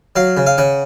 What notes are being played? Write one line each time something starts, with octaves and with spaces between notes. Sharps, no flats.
F#3 F5
C#3
F5
C#3 F#5